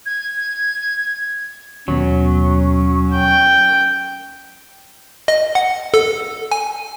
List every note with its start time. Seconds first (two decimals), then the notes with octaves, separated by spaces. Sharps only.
0.06 G#6
1.88 D#2 B2 F#3 C#4
3.14 G5
5.28 D#5
5.55 F#5
5.94 A4
6.51 G#5